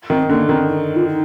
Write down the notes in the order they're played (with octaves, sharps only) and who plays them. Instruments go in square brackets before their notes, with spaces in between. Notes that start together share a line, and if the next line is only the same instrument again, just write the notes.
[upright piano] D#3 [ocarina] C4
[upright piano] D3 [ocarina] A#3
[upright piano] D#3 [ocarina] C4
[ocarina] D#4
F4
D#4